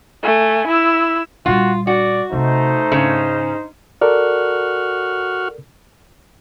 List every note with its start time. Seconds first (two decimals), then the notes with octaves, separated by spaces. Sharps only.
0.23 A3 G#5
0.67 E4 E6
1.46 A#2 G3 F4 F#4
1.87 F#4 D5
2.33 C3 F3 A3 D#4 C5
2.92 G#2 C#3
4.01 F#4 A4 A#4 D5 F6